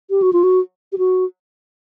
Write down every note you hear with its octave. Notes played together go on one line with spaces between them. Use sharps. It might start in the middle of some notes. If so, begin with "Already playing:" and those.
G4
F#4
F4
F#4
G4
F#4